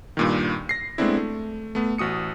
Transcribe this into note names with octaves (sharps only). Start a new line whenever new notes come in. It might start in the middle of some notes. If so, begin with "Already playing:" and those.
G2 A#2 D#3
A#6 C7
G#3 A3 B3 C4 D4 E4
A3
A3 B3
A1 F#4 D#6 C#7